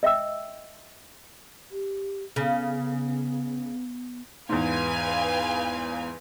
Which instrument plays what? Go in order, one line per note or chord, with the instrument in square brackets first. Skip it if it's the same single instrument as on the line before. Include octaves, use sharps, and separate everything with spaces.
[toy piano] D#5 E5 G5 E6
[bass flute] G4
[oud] C#3 [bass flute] B3
[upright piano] E2 G#2 [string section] B4 F5 G#5